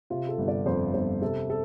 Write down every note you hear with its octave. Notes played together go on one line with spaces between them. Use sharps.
C3 F4
A4
G1
D5
F2 C5
G1 C5
C3 A4
A4